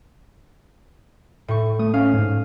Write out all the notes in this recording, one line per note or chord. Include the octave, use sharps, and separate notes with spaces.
A2 C#6
A3 D#6
C#4 F5
G#2